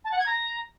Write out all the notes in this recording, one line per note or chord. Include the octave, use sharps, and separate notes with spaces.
A5
F#5
G#6
A#5